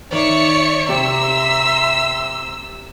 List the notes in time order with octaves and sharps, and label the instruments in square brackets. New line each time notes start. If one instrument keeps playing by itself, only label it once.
[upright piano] D#3 [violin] C#5 [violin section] D5 E5 C#7
[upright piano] C3 G4 [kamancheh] E5 A#5 [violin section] C6 [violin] E6